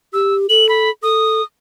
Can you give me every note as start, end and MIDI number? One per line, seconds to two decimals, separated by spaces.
0.13 0.46 67
0.13 0.35 88
0.49 0.90 69
0.49 0.69 102
0.69 0.89 83
1.03 1.41 69
1.03 1.43 87